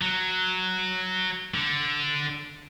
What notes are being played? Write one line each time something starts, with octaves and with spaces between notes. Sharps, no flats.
F#3
D3